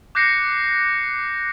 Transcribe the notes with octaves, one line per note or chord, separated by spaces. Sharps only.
D6 F#6 G6 A#6 C7 C#7